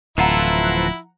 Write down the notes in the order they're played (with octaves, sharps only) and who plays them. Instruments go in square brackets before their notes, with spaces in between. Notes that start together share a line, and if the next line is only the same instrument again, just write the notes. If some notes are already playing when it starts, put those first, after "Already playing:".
[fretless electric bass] D1 [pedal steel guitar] E3 F4 A4 [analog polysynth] F3 F#5 A#5 [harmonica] E4